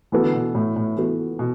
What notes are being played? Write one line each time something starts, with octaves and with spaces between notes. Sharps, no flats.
E3 B3 F#4 A4
D3
B2
A2
A2
E3 B3 F#4 A4
B2